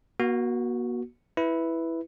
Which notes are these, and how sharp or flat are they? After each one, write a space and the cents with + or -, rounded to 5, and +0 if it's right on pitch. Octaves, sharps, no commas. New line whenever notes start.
A#3 +45 F#4 +0
E4 +0 B4 +0